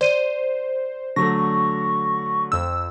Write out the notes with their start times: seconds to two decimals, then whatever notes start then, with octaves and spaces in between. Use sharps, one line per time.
0.01 C5 D5 D#7
1.16 D3 F#3 A3 C#6 A#6
2.52 F2 E6